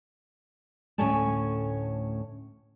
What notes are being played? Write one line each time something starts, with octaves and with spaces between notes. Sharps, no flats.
D2 A2 C#4 C#5 G#5 A5